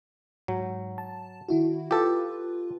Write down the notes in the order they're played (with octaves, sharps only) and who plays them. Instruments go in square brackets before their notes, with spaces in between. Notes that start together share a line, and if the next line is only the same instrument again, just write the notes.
[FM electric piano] G#2 [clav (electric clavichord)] F#3
[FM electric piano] A5
D#3 E4 F#4
[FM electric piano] F4 B4 [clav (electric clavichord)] G4 A4